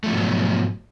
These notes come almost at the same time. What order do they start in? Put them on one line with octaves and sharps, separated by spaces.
A3 F3 G#2 B2 F#3